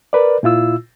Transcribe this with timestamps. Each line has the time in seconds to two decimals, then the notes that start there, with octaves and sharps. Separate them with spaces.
0.13 A#4 B4 D5
0.43 A#2 E4 F4 E6